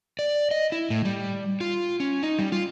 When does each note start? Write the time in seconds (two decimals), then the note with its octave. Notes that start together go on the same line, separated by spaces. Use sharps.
0.19 D5
0.51 D#5
0.72 E4
0.90 A2
1.05 G3
1.61 F4
2.00 C#4
2.23 D#4
2.39 G3
2.52 F4